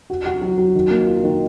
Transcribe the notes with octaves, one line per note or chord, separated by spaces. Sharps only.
F#4
F#4
F#3
F#3
D#3
A#3
F4
D#3